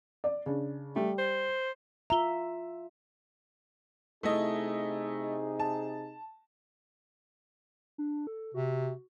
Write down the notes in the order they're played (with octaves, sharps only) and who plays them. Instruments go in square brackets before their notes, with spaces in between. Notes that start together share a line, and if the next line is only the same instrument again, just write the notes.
[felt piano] D5
C#3 D4
[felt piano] G3 [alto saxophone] A3
[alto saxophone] C5
[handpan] F4 E5 [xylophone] A#5 G7
[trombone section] C3 D#4 G#4 [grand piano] A3 E4 D#5
[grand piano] A5
[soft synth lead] D4
A4
[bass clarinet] C3 [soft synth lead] F#4